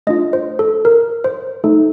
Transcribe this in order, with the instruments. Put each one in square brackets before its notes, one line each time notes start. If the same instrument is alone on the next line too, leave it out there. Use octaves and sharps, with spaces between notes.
[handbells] A3 D4 F4 D#5
C5
A4
A#4
C5
A3 D#4 A4